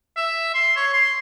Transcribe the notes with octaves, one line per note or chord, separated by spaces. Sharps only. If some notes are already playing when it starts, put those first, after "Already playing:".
E5
C6
C#5
C6